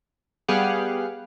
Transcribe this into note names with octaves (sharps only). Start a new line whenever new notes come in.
G3 B3 G4 G#4 F5 F#5